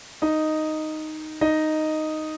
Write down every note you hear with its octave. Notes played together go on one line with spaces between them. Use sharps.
D#4 D#5
D#4 D#5